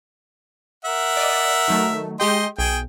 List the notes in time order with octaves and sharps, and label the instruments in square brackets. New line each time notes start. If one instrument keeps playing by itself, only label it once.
[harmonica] A#4 E5 F#5
[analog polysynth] D5 D#5
D#3 F#3 A3
[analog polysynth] G#3 G4 G5 [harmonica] D#5 C6
[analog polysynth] B1 [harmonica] G#4 G5